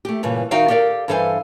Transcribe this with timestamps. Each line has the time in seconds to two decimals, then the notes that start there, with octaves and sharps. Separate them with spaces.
0.05 A3 G4
0.23 G2 A#2 C#3 E3
0.51 D#3 D#4 F#4 E5 F5 G5
0.68 G4 A4 A#4 D5 F5
1.08 G2 E3 A4 C5 F5 G#5